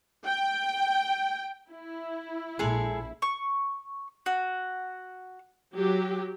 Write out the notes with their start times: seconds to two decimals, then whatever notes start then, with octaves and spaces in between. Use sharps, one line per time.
0.25 G5
1.70 E4
2.59 A#1 G#3 G#4 A4
3.22 C#6
4.26 F#4
5.75 F#3 G4